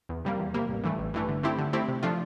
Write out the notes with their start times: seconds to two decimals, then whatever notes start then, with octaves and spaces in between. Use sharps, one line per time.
0.09 E2
0.25 C3 G3 A#3
0.39 E2
0.54 C3 G3 A#3
0.69 A1
0.84 G2 E3 A3
0.99 A1
1.14 G2 E3 A3
1.29 D3
1.43 A3 C4 E4 G4
1.58 D3
1.73 A3 C4 E4 G4
1.88 C3
2.03 F3 A3 D4 F4